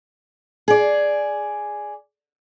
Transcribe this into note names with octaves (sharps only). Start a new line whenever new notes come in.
G#4 D5